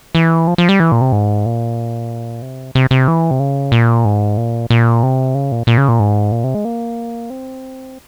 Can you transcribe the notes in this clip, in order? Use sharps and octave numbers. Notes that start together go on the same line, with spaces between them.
E3
F3
F3
G3
E3
A#2
C3
G#2
A#2
C3
C3
C3
E3
C3
C#3
A#2
G#2
A#2
A#2
C3
C#3
A#2
A#2
C#3
A#2
G#2
A#2
C3
G#3
A#3
C4